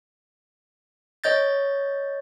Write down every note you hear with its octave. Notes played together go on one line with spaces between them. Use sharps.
C#5 D#5 G6 A6